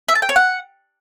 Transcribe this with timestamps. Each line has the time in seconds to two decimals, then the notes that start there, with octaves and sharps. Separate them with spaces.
0.08 E5
0.15 A5
0.22 G5
0.29 C#5
0.36 F#5